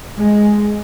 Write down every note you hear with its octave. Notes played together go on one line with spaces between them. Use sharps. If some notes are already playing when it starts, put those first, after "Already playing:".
G#3